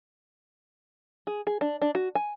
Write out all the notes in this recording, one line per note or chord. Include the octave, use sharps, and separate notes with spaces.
G#4
G#4
D4
D4
F#4
G#5